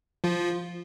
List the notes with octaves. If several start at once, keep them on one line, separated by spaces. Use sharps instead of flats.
F3 F4